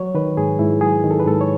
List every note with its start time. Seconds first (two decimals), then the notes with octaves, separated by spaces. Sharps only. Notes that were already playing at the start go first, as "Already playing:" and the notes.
Already playing: F#3 C#5
0.15 D#3 B4
0.37 G#2 G#4
0.59 G#2 E4
0.81 F#3 G#4
1.04 D#3
1.11 A4
1.20 B4
1.26 G#2 A4
1.41 C#5